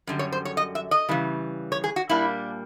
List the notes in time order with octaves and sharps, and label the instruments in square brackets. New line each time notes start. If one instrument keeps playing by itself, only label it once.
[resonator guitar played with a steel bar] F#2 D3 G3
C#5
C5
C#5
D#5
E5
D#5
C#3 E3 G3
C#5
G#4
F#4
A#2 G3 A#3 D4 E4